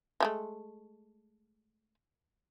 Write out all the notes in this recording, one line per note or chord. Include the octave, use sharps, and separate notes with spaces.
F3 G#3 A3